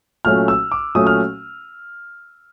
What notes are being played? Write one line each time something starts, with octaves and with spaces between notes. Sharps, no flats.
A#2 F#3 A3 C#4 F6
E6
D6
A#2 F#3 A3 C#4 D#6
F6